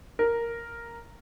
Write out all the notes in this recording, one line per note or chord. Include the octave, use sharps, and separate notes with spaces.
A#4